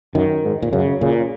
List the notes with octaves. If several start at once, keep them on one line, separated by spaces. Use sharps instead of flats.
F#2 D#3
G#2
A#2
F#2 C#3
A#2 C#3